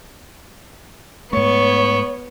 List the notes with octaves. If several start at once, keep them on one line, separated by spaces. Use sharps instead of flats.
G#2 A3 B3 C#5 C#6